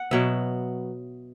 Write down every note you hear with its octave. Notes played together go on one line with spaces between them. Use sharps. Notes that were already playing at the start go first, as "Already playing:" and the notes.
Already playing: F#5
B2 F#3 B3 E5